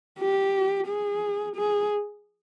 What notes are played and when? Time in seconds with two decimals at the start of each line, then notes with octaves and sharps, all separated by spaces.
0.19 G4
0.88 G#4
1.56 G#4